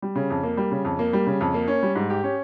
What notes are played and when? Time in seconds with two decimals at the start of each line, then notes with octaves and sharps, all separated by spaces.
0.02 G3
0.15 C#3
0.30 F2
0.43 A#3
0.57 G3
0.71 C#3
0.85 F2
0.99 A#3
1.13 G3
1.27 C#3
1.41 F2
1.54 A#3
1.68 C#4
1.83 G3
1.95 G#2
2.10 G4
2.24 C#4